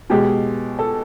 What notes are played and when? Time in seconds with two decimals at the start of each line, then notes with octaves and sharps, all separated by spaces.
0.10 B2 G#3 G4
0.79 A4